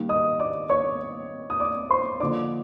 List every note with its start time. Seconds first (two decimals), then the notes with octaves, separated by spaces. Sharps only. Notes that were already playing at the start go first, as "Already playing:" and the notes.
Already playing: D#3 G3 A#3
0.09 D#5 D#6
0.39 D5 D6
0.69 C#5 C#6
1.50 D#6
1.60 D5 D6
1.90 C5 C6
2.20 D3 F3 A#3 D#4 D5 D6